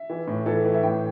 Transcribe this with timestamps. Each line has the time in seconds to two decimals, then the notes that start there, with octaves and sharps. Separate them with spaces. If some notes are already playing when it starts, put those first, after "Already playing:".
Already playing: E5
0.10 E3
0.27 A2
0.46 E3 A4
0.65 E3
0.74 E5
0.83 A2 G5